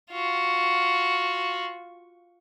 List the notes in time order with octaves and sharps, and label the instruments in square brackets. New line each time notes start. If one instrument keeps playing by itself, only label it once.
[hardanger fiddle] F4 F#4